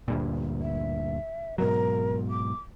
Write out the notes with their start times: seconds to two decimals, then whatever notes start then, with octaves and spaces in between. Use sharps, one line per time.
0.08 D2 G2 A#2
0.62 E5
1.58 G#2 B2 F#3 A#4
2.30 D6